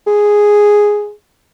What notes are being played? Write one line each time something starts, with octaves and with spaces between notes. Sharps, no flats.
G#4